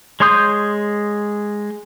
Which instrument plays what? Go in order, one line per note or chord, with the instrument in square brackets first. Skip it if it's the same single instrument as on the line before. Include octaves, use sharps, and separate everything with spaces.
[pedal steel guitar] G#3 C#5 C6 D#6 G6